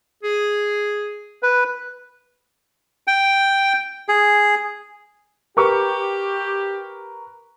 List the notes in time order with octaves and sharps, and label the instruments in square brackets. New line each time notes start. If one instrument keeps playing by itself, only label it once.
[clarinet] G#4
[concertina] B4
G5
G#4
[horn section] G4 [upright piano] A#4 B4 C#6